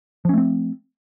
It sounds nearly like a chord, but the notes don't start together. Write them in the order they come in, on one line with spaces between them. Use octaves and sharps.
F3 C#4 A3 C4